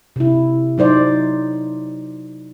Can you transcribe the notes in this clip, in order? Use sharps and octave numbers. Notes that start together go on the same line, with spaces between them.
C3 E4
F#3 D#4 C5 D5